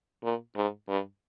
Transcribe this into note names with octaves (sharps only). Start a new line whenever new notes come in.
A#2
G#2
G2